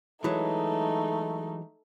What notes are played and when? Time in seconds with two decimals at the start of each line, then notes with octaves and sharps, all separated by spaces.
0.24 E3 F#3 G#3 A3 D#4